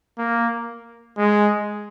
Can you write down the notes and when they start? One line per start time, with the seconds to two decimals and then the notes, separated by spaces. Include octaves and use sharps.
0.18 A#3
1.18 G#3